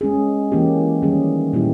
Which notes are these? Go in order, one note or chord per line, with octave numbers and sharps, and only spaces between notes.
G#3 C#4 G#4
E3 A#3 C#4 G4
D#3 G3 C#4 G#4
A#2 G3 A#3 E4 G4